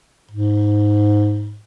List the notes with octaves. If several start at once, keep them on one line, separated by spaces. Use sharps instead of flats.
G#2